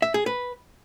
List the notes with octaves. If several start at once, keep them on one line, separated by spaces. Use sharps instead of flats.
E5
G#4
B4